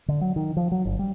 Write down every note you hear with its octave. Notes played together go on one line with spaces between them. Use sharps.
D3
F#3
D#3
F3
F#3
G1
G3